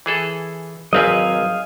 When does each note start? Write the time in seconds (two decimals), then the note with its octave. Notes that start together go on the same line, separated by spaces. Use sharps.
0.06 E3 G#4 A4
0.93 G#1 F#3 C4 B4 D#5 F5 G#5